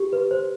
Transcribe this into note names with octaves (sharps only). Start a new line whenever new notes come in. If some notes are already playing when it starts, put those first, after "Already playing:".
Already playing: G4
B4
C5